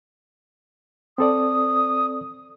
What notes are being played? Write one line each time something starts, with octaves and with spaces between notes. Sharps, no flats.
C4 A4 D5 D#6